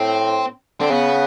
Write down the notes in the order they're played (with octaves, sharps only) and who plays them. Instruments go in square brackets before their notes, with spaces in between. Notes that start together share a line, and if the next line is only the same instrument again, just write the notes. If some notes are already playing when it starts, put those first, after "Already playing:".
Already playing: [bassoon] A2 [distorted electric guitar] C4
[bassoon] D3 [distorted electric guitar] C4
[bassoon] C#3 [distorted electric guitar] B3